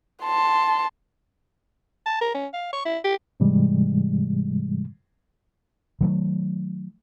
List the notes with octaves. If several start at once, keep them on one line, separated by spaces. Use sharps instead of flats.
A5 C6
A5
A#4
C#4
F5
C#6
E4
G4
G#2 C3 E3 G3 G#3
D#3 F#3 A3